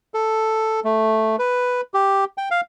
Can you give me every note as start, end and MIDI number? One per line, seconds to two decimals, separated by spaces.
0.14 0.80 69
0.84 1.36 57
1.39 1.81 71
1.94 2.24 67
2.38 2.49 79
2.51 2.61 77